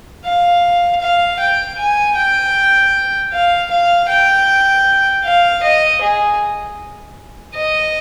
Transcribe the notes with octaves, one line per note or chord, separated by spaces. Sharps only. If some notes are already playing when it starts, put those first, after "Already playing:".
F5
F5
G5
G#5
G5
F5
F5
G5
F5
D#5
G#4
D#5